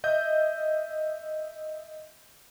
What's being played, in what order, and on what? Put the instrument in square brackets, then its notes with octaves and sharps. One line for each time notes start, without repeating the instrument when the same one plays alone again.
[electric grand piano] D#5 E5 G6